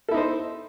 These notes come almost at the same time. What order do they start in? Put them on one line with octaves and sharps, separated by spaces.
A4 E4 D#4 C5